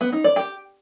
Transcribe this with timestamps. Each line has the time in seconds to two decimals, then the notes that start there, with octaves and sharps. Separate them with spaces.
0.01 B3
0.12 D#4
0.24 D5
0.36 G4